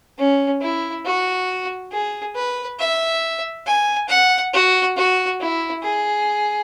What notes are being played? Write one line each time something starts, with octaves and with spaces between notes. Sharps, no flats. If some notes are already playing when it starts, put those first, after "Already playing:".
C#4
E4
F#4
G#4
B4
E5
G#5
F#5
F#4
F#4
E4
G#4